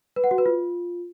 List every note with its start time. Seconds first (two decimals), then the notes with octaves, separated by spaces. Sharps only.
0.16 B4
0.24 F#5
0.31 F#4
0.38 B4
0.46 F4